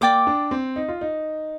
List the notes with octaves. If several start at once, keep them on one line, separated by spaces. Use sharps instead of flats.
A#3 D5 G5 D6
D4
C4
D#4
F4
D#4